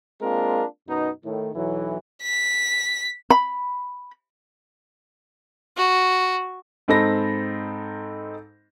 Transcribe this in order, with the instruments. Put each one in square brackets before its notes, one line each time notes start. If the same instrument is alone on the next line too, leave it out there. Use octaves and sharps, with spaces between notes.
[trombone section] G#3 A#3 C4 D4 F4 A#4
F#2 B2 B3 D#4
A2 D#3
B1 E3 F#3
[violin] B6
[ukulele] B5
[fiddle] F#4
[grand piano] G#2 C4 D#4 A4 B5 A#6